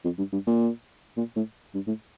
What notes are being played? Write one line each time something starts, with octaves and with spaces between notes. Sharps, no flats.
F2
G2
G2
A#2
A#2
A2
G2
A2